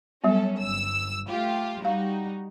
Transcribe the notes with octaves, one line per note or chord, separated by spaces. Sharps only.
F#3 G3 B3 C#4 A4
G1 E6
A3 F4 G4
G3 D#4 F#4 F5